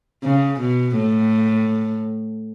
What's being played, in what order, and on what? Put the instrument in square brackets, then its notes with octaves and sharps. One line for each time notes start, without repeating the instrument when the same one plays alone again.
[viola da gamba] C#3
B2
A2